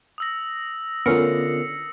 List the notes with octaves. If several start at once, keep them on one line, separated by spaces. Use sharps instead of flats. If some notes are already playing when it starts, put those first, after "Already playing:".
D#6 E6 A#6
D3 A3 B3 C#4 F4 A#4 C7 C#7